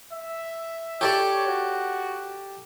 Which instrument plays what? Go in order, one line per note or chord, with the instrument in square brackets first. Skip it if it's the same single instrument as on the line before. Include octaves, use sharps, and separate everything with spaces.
[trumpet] E5
[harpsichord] G4 A4 D5 [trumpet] C#5
[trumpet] F#4